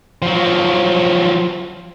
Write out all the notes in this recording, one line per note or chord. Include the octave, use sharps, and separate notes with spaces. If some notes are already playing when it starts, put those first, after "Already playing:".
F3 F#3